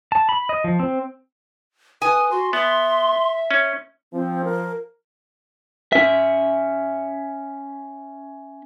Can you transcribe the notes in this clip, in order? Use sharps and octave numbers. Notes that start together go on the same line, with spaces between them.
A5
B5
D#5
F3
C4
B4 G#5 D#6
F#4 C6
B3 E5 C6
C#4
F3 C4
A#4
C#4 E5